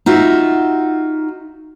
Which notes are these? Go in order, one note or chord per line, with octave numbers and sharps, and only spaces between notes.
D#4 F4 F#4 E5